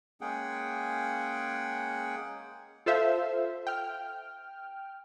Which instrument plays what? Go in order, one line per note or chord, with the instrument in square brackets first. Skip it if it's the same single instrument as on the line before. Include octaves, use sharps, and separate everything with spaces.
[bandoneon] G#3 A#3 C#4 G#4 F#5 G5
[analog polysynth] F4 A4 C5 E5 F5
G5 F6